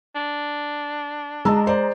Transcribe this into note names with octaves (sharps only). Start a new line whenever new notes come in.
D4
G#3 D#5 A5 A#5 E6
C5 D5